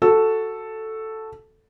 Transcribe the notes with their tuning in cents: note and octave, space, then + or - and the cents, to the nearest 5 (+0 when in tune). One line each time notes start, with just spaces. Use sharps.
F#4 +0 A4 +0